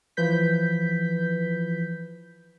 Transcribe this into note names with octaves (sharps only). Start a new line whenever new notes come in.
E3 F3 B4 G6 B6